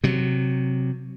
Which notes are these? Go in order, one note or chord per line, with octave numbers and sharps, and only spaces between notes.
C3 F#3